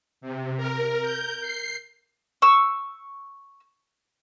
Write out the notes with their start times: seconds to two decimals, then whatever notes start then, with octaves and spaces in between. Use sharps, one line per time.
0.21 C3
0.57 A#4
1.02 G6
1.41 C7
2.42 C#6 E6